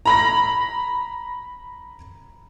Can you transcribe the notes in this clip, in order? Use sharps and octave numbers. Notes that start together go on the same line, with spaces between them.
A#5 B5 A#6